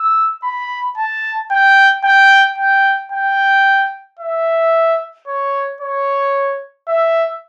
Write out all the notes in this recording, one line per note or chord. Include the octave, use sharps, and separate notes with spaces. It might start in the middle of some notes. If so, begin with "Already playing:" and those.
Already playing: E6
B5
A5
G5
G5
G5
G5
E5
C#5
C#5
E5